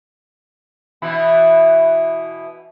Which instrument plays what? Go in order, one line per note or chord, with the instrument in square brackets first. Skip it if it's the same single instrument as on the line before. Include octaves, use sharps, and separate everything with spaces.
[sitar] B2 E3 E4